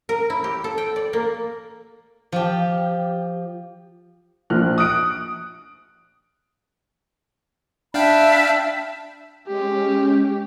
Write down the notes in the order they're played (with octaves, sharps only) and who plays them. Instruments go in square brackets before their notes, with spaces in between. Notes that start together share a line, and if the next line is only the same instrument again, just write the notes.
[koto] A#4
E4
G4
A4
G5
D5
A#3
[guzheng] F3 G4
[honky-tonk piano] A#1 F3 F6 F#6
D#6 F#6 D7
[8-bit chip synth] D4 F5 G5 [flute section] E5 A5 B5
[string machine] G#3 C#4 [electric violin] G4